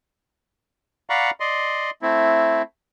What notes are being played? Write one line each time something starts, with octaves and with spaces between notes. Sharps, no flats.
D5 F5 F#5 A#5 B5 C#6
D5 D#5 C6
A3 C4 E4